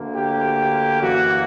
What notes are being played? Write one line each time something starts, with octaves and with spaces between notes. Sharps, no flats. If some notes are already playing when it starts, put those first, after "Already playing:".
Already playing: D2 D3 A#3
G4
F#2 E3 A#3 F#4